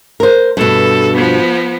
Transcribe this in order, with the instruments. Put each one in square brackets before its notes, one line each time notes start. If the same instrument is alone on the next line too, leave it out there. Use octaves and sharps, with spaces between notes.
[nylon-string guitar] A#4 C5
[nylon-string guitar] G2 B2 [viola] A4
[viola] F3 B3